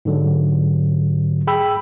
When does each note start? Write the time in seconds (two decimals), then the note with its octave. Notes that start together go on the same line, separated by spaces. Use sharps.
0.05 G#2 D3 F#3
1.47 G#4 G5 B5 E6